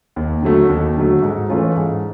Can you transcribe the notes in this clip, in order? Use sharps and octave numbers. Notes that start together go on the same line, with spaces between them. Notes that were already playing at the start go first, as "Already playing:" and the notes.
D#2
D3 F#3 A3
D#2
D3 F#3 A3
G#2
E3 A3 C#4 F4
G#2